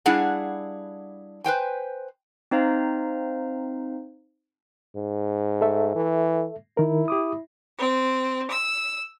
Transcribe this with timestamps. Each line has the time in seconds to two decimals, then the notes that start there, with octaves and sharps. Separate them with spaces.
0.06 G3 D4 E4 G#4 F5 F#5
1.44 B4 C5 G5 G#5
2.51 C4 D#4 C5 F5 A#5
4.95 G#2
5.61 A4 E5
5.95 E3
6.77 D#3 E4 A#4
7.08 G4 D6 D#6
7.77 C4
8.49 E6